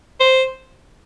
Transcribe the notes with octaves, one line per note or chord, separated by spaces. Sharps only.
C5